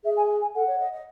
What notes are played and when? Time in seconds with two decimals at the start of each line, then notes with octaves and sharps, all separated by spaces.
0.04 G#4 E5
0.17 G#5
0.41 G#5
0.55 A4 F#5
0.67 C#5
0.80 D#5
0.93 D#5